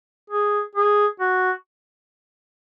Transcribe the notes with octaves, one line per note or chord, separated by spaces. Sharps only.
G#4
G#4
F#4